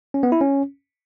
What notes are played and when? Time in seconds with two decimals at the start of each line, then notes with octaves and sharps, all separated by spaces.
0.14 C#4
0.23 B3
0.32 E4
0.41 C#4